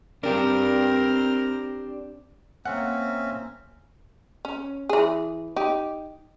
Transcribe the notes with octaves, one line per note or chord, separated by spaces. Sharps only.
C4 D4 G4 A#4
A#3 C4 C#4 E5 F#5
C#4
E3 G#4
D#4 G4